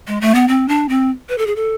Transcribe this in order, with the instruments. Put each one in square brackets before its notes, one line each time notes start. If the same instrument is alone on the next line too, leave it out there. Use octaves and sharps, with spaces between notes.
[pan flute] G#3
A3
B3
C4
D4
C4
B4
A4
G#4
A4